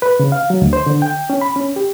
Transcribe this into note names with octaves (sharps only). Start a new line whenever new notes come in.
B4
C#3
F5
F#3
D2
C5
D3
G5
C#4
B5
C#4
G4